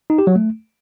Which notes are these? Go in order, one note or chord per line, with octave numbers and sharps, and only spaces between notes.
D#4
G4
F#3
A3